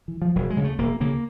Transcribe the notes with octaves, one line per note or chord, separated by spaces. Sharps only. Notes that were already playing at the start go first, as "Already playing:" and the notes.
E3
F3
E1 F#3
G#3
D2 C#3
A3
E1 A#3
D2 C#3 A#3